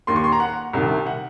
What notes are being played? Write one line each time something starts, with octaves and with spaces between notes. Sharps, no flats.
D#2 D#3 C6
C#6
C6
A#5
F#5
C2 C3 D#3
F#5